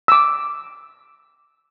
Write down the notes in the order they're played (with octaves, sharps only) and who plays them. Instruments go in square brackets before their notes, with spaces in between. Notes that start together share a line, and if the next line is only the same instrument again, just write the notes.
[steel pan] D6 E6